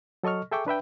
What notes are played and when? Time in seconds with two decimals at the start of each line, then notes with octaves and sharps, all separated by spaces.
0.23 F#3 A4 D#5 C#6 F6
0.51 G#4 A4 E5 G5 C#6 D6
0.66 D4 B4 E5 G5